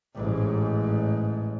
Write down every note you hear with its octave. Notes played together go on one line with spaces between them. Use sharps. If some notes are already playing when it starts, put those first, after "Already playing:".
A1 G#2